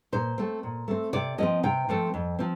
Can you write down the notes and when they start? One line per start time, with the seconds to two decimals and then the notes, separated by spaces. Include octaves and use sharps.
0.12 A#2 C5
0.38 A3 C4
0.63 A#2
0.88 A3 C4
1.13 C3 D5
1.38 F3 A3 C4 D#5
1.63 C3 G5
1.89 F3 A3 C4
2.14 F2
2.39 F3 C4